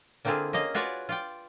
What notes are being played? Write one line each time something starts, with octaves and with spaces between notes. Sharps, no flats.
D3 A#3 C4 E4 F4 G#4
A#3 C#4 D#5 F5
F4 F#4 B4 C#5 D5 G#5
F4 D5 G5